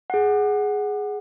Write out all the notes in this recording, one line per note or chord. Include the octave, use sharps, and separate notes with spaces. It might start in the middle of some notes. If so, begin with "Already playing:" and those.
G#4 F#5